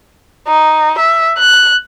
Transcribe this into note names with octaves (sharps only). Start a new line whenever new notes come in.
D#4
E5
F#6